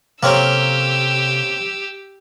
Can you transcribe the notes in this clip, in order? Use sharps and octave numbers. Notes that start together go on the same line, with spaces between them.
C3 A#3 C4 C#4 G4 A4 A#5 E6